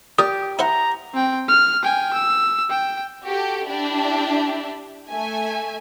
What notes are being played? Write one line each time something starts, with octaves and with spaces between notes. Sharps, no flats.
G4 A#4 D5 D#6
E4 C5 F#5 A#5
C4 G5
F6
G5 G#5
E6
G5
F#4 G4 A4
D4 E4 G4 E5
A3 E5 G#5